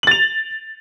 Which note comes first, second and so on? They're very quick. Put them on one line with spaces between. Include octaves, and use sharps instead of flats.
F#7 A6 F7